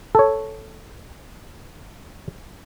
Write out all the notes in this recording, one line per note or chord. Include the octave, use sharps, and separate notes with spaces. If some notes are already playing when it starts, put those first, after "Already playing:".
A4 C#5